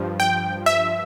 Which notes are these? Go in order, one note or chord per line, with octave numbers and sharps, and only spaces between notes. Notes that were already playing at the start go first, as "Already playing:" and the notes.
Already playing: G2 F3
G5
E5